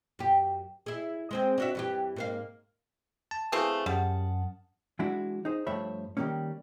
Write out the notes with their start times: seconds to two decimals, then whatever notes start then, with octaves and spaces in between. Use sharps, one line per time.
0.19 F#2 G4
0.86 E4 G#4
1.31 G#3 C4 G#4
1.58 D4 F#4 E5
1.75 G2 E3 G4
2.16 G#2 A#3 F5
3.31 A5
3.52 E3 A3 C4 G#4 F5
3.86 F#2 G3 F#5 A5
4.99 E3 G#3 D4 E4 F#4
5.45 D#4 G#4 C5
5.67 G2 F3 A3 C#5 E5 B5
6.17 D#3 G3 G#3 A#3 C#4